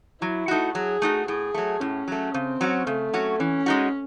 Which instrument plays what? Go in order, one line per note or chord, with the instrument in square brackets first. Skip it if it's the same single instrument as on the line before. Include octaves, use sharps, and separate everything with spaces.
[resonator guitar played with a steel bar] F#3 [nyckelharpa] E4
[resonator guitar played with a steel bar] A3 D#4 F#4
[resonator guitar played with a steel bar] F#3 [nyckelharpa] G#4
[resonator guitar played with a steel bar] A3 D#4 F#4
[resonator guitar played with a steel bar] A2 [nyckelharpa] G#4
[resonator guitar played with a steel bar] F#3 A3
[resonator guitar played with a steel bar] A2 [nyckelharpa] C#4
[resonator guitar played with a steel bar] F#3 A3
[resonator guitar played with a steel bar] C#3 [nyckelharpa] C4
[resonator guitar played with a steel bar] F#3 C#4 F#4
[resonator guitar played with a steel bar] C#3 [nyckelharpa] A3
[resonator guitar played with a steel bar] F#3 C#4 F#4
[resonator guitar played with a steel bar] E3 [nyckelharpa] C#4
[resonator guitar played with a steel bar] G#3 D#4 F#4